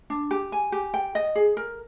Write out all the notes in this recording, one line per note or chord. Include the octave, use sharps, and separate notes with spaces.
D4
G4
G#5
G4
G5
D#5
G#4
A#4